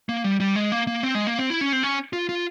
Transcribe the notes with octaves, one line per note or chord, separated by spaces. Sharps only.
A#3
G3
G3
G#3
A#3
A#3
C4
G#3
A#3
C4
E4
C#4
C4
C#4
F4
F4